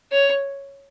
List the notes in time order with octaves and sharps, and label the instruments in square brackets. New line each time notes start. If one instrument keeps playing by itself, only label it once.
[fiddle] C#5